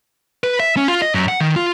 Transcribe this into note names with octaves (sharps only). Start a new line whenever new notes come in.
B4
E5
C#4
F4
D#5
F#2
F#5
D#3
F4